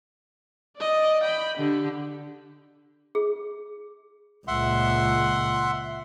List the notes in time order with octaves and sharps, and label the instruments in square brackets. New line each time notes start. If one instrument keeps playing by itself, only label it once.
[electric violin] D5 D#5
G5 B5
[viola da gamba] D3 [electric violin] G4
[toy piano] G#4
[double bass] C#2 A#2 [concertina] E5 F#5 C6